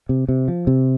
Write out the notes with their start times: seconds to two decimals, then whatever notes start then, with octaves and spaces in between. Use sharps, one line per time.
0.09 C3
0.29 C3
0.48 F3
0.67 C3